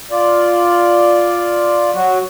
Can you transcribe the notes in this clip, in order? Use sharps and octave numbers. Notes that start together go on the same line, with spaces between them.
F4 D5
F#3 F#4